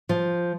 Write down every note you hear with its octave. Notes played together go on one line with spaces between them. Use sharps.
F3